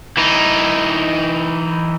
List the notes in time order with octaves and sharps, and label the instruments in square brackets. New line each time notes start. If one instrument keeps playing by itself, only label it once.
[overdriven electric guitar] E3 D#4